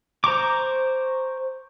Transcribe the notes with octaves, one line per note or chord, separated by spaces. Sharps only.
C5 A#5 C#6 D6